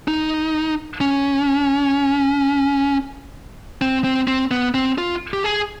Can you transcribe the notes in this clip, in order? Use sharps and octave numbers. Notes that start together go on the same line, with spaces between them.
D#4
C#4
C4
C4
C4
B3
C4
F4
G4
G#4